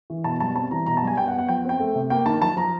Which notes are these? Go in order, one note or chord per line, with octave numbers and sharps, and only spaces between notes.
E3
B2 A5
G3 A5
C4 A5
E3 A#5
B2 A#5
A5
G3
G#5
B3 G5
F#5
B3
F#5
F3 G5
C4 G5
A3
C3
A#3 G5
D#3 A5
F3 A5
F3 A#5